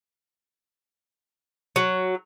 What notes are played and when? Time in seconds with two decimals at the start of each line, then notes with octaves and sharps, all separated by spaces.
1.76 F#3